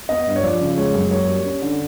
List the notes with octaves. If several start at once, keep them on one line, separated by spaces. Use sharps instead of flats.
B3 D#5
G2
C#5
F3 D5
C#3
G#3 C#5
F#2
A#3 C#5
G3
C#4
D3